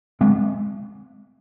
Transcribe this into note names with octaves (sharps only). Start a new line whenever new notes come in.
G#3 C4